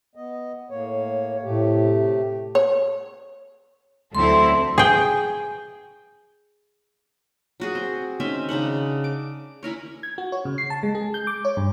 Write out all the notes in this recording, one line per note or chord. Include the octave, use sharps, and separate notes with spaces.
B3 D#5
A2 A#3 C#5
A2 C3 A3 G4
C#5
D2 F#3 C4 E4 A4 C6
G#4 G5
F#3 F#4 G#4
C4
D#3 C4 C#4 E5
C#3 D4 D#4 F#5
D6
C#4 E4 A#4 C#5
G#6
F#4
C#5
C#3
C7
A5
G#3
G#4
G6
D6
C#5
G2